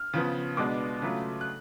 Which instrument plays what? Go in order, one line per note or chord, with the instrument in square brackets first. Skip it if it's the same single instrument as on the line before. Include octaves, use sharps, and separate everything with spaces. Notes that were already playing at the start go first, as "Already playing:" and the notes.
Already playing: [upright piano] F6
C#3 F3 B3
B2 G#3 B3 D4 D6
C#3 F#3 A3 F4
F#6